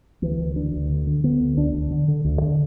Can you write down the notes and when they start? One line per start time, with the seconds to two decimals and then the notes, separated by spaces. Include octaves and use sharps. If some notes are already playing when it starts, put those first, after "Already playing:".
0.22 D2 E3
0.39 D2
0.56 D3 D4
0.73 D2
0.90 D3
1.07 D3
1.24 D3 B3
1.40 D2
1.57 D2 D4
1.74 D2
1.91 D3
2.08 D3
2.25 D2
2.42 D3